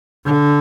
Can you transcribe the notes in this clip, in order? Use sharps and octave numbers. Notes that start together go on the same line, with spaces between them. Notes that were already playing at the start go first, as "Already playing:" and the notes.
D3